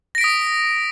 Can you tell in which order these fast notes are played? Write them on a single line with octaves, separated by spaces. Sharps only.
A#6 D7 B6 D#6